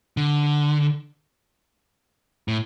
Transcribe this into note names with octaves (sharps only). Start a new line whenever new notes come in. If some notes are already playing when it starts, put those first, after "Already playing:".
D3
A2